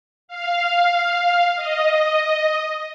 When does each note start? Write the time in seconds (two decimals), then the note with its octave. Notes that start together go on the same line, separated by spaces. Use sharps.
0.28 F5
1.56 D#5